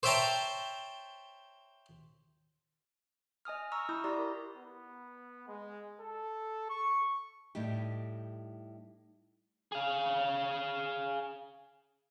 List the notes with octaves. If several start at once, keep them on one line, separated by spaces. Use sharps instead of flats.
C5 C#5 E5 G5 A5 A#5
D#5 G#5 D#6 F6
A#5 C#6 E6 F6 A#6
E4 D#6 G6
E4 G4 D5 A#5 C6
A#4
B3
G#3
A4
C#6
A2 G3 D#4 G4
G#4 F5